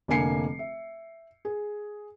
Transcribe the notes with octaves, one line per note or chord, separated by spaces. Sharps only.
F1 D3 A#3 G#5 C7 C#7
E5
G#4